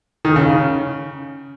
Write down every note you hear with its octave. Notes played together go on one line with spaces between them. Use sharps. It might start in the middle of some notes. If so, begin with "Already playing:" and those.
D#3
C#3